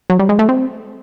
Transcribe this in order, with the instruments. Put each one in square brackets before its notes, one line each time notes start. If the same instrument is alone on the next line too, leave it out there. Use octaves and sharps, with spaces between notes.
[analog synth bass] F#3
G3
G#3
A3
C4